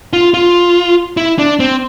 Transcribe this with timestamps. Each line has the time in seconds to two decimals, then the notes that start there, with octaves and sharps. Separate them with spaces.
0.13 F4
0.34 F4
1.17 E4
1.39 D4
1.60 C4